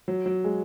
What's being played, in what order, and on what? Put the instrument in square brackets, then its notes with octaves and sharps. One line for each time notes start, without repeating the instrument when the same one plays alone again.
[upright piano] F#3
F#3
G#3